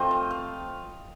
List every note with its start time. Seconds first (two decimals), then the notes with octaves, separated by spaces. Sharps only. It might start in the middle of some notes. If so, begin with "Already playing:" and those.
Already playing: F3 A3 C4 F4 D#5
0.11 F5
0.31 F5